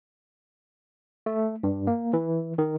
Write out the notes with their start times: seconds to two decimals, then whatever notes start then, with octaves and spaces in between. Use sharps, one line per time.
1.26 A3
1.63 G2
1.87 A#3
2.13 E3
2.58 D#3